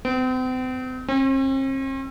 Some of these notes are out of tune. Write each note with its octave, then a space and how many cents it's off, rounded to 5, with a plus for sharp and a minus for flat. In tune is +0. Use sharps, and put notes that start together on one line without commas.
C4 -40
C4 +45